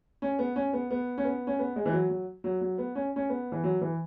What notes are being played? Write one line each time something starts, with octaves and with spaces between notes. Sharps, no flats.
C#4
B3
C#4
B3
B3
C#4
B3
C#4
B3
G#3
E3
F#3
F#3
F#3
F#3
B3
C#4
C#4
B3
E3
F#3
E3